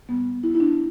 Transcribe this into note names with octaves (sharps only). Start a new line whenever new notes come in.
A2 G3 B3
E4
E4
D4